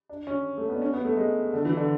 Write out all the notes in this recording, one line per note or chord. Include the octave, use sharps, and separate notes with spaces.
D4
C#4
A3
B3
D4
C#4
B3
A3
G#3
D3
E3
D3